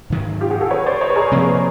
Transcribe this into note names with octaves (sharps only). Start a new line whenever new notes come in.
G#2 D#3 F#3
F4 G4
F#4 G#4
G4 A4
B4 C#5
C5 D5
C#5 D#5
B4
G#4 A#4
C3 F3 A#3